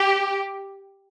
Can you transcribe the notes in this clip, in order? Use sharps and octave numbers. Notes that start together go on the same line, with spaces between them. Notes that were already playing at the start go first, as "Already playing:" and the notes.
Already playing: G4